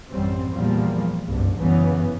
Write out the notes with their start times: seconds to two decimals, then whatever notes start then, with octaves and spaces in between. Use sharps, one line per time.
0.11 A1 F#2 G3 C4
0.53 E2 A#2 F3 G3 A#3
1.26 F#1 C2 G2
1.59 G1 F#2 C#3 E3 B3